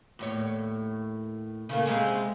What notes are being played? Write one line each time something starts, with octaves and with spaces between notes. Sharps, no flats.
D#2 A2 C#5
C#3 A3 A#3
C3 G#3 G#4